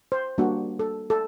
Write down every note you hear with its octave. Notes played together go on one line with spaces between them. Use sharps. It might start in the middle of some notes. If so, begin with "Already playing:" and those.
C5
G3 A#3 D4 F#4
A4
A4